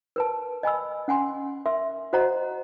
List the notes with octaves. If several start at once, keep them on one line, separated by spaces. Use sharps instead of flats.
A#4 B4 A5
D#5 G#5 B5 E6
C#4 F#5 G#5 C6
A#4 E5 C6
F#4 C5 D#5 F#5 A#5